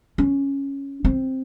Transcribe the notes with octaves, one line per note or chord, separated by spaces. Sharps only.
C#4
C4